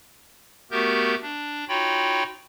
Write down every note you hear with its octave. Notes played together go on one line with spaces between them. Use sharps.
A3 B3 F#4 G4 A#4 G6
D4
D#4 F4 F#4 C#5 G5 B5